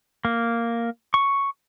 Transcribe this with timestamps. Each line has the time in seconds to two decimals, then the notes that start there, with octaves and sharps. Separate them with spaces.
0.25 A#3
1.14 C#6